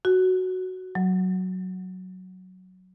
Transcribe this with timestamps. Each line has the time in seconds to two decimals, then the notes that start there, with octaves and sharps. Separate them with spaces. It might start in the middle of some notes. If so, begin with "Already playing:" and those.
0.05 F#4
0.95 F#3